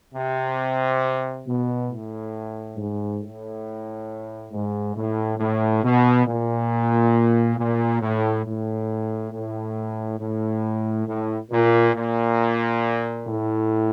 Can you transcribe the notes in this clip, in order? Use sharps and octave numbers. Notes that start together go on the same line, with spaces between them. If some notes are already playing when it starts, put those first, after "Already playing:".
C3
B2
A2
G#2
A2
G#2
A2
A2
B2
A#2
A#2
A2
A2
A2
A2
A2
A#2
A#2
A2